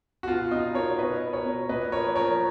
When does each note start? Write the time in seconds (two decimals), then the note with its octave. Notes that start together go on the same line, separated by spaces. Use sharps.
0.23 F#4
0.28 B2 F4
0.51 B2 D#4
0.75 B2 A#4 C#5
0.98 B2 B4 D#5
1.23 B2
1.33 A#4 C#5
1.45 B2
1.69 A#2 B4 D#5
1.92 F3 A#4 C#5
2.16 F3 A#4 C#5